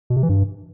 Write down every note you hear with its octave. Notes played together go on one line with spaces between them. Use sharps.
B2
C3
E3
G2